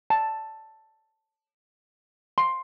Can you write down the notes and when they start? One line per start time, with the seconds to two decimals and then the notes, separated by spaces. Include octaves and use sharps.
0.10 A5
2.38 C6